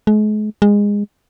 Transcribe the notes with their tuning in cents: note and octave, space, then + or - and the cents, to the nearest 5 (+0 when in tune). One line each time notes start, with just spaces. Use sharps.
G#3 +40
G#3 -20